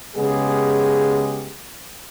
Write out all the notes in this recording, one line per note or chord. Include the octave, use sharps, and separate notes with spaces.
C#3 G#3 B3 G4 G#4